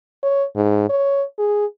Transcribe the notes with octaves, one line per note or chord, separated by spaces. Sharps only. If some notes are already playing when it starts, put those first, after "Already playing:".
C#5
G#2
C#5
G#4